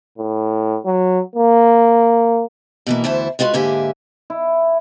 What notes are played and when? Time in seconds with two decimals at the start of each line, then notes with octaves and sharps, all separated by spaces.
0.18 A2
0.86 F#3
1.36 A#3
2.87 B2 E3 A#3
3.04 D2 E3 E4 C5 A5
3.39 G#3 B3 F4 F#4 B4
3.53 G#2 D3 A#3 G4 E5 G#5
4.30 E4